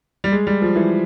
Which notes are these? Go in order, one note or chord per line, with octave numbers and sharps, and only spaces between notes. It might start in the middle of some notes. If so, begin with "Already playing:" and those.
G3
G#3
G3
F3
E3